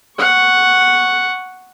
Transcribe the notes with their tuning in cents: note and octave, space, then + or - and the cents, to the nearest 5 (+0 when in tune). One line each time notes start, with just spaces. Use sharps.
F#5 +0 C#6 +0